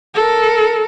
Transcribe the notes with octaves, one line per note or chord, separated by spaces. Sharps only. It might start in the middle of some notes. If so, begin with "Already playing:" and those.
A4 A#4